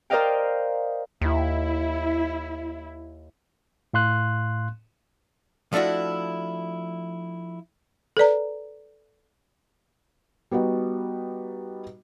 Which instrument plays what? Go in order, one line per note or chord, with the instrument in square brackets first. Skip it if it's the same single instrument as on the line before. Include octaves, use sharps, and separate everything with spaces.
[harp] A#4 C5 D5 D#5 F5 G5
[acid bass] D#2 [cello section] E4
[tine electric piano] A2 F5 C6 F#6
[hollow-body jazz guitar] F3 A3 D4 E4 F#4
[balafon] A4 B4 D5 A#5
[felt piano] G3 B3 D#4 F#4